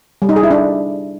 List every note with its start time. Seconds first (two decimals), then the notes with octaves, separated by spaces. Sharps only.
0.22 G3
0.29 D#4
0.36 G#4
0.43 E4
0.51 D4